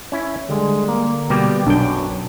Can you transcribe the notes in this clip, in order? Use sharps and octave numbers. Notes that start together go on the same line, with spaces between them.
C#4 E4
D3 G3 G#3
A#3
B2 G3 A#3 G4
B1 F#2 D4 G5